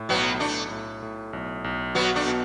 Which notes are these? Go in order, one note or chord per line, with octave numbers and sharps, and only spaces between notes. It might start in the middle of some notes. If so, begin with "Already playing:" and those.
Already playing: A2
B1 F#3 B3
B1 A3 D4
A2
A2
B1
B1
F#3 B3 F#4
A3 D4
B2